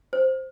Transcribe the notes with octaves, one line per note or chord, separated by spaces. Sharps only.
C5